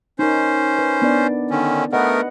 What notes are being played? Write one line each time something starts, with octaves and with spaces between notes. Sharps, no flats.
C#4 D#4 A#4 C5
B4
B3 D4 D5
D3 D#3 C#4
A3 B3 A#4 B4 D#5 F#5